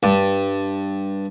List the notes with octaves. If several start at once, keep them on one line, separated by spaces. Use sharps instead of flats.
G2